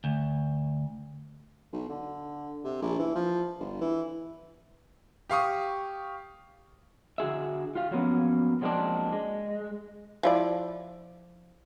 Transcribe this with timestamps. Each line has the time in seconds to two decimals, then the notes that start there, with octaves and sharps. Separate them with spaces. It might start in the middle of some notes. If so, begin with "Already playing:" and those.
0.04 D2
1.73 B1
1.89 D3
2.64 C3
2.82 A#1
2.99 E3
3.15 F3
3.59 G1
3.81 E3
5.30 G4 F5 C#6 D#6
7.18 D3 F#4 G#4 E5
7.75 F4 G4 F5
7.91 F3 F#3 A#3 B3 C#4
8.61 F3 F#3 G#3 A#3 C4 D4
9.13 G#3
10.23 F3 E4 D5